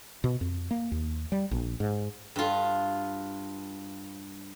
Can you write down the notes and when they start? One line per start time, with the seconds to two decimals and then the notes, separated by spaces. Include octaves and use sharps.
0.24 B2
0.41 F2
0.71 A#3
0.92 D#2
1.32 G3
1.51 A#1
1.80 G#2
2.36 G2 F4